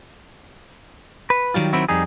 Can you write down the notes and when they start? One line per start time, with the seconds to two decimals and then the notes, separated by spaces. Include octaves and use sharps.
1.30 B4
1.54 D#3 F#3 G3 F4
1.73 D#3 F#3 C4 E4 F#4
1.89 F2 G3 D#4 G#4